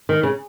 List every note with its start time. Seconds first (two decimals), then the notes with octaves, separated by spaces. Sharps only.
0.09 D#3
0.23 C#3